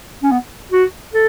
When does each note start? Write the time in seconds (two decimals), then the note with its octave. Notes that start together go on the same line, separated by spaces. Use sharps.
0.23 C#4
0.31 B3
0.72 F#4
1.13 A4